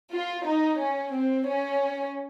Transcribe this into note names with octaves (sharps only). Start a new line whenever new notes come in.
F4
D#4
C#4
C4
C#4